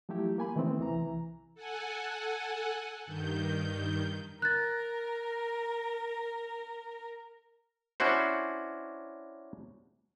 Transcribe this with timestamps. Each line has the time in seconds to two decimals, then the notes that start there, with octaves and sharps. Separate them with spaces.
0.09 F3 F#3 A3 E4 G4
0.38 A#3 G#5 B5
0.56 D#3 E3 A3 B3 C4
0.79 C2 E3 A#5
1.55 A4 F#5 G#5
3.06 G2 D#3 G6
4.42 A#4 F#6 A6
8.00 C#4 D4 E4 F#4 C5